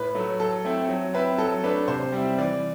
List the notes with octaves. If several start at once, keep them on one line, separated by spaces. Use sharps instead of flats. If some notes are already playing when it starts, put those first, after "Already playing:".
Already playing: A2 B4
F#3 A3
F#3 A4
A3 C4 E4
F#3
C4 E4 B4
F#3 A4
A3 D4 B4
C3 C5
G3 C4 E4
E3 D5